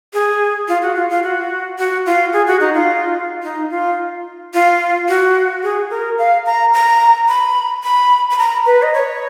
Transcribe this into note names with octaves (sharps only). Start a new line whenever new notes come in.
G#4
F4
F#4
F4
F4
F#4
F#4
F4
G#4
F#4
D#4
F4
D#4
F4
F4
F#4
G#4
A#4
F5
A#5
A#5
B5
B5
B5
A#5
B4
D#5
C#5